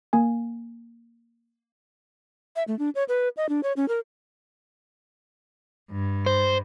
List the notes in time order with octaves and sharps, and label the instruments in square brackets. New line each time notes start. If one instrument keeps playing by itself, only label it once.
[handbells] A#3 G#5
[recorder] E5
A3
D4
C#5
B4
D#5
D4
C#5
C#4
A#4
[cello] G2
[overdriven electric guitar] C5